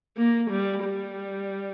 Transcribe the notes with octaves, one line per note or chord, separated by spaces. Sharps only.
A#3
G3
G3